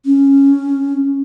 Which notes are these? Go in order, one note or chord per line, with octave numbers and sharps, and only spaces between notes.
C#4